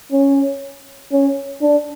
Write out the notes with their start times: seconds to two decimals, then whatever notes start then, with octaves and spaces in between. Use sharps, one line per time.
0.12 C#4
1.12 C#4
1.62 D4